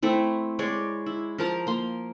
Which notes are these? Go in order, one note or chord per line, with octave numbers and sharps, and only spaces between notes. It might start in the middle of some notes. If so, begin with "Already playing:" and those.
A3 C4 E4
G#3 C#5 D5
E4
F3 A#4 A5 A#5
A#3 C6